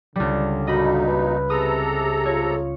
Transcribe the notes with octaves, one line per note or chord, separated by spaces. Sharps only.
C#2 D3 G3
G2 A#2 D#4 F#4 D#5 B5
B4
C3 G#4 A4 A#5 D#6 E6
F4 C#5